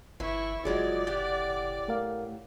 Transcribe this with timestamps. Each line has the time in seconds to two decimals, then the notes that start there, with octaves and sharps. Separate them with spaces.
0.20 G1 E3 E4 C#6
0.65 F#1 F3 F#3 G#3 G#4 D5
1.07 A2 G4 F#5 A6
1.88 A3 A#4 F5